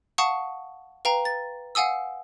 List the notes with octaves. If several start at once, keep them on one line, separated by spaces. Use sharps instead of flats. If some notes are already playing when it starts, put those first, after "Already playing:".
F5 F#5 A5 C#6 D#6
B4 F5 G5 A#5
A6
F5 F#5 G#5 D#6 E6